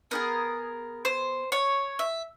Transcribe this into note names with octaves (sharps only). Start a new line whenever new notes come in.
B3 D#4 G#4 A#4
C5
C#5
E5